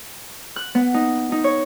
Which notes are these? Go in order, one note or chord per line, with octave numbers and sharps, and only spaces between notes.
F#6
B3
D#4
D#4
C#5